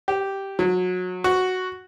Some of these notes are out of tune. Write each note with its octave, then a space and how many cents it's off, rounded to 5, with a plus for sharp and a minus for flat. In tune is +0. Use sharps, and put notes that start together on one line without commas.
G4 -5
F#3 -25
F#4 +0